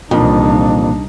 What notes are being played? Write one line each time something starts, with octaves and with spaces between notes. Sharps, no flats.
C2 F2 A#2 E3 A#3 D4 D#4